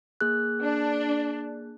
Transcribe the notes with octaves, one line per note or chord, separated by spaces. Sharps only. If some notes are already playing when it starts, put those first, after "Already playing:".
A#3 G#4 F#6
D4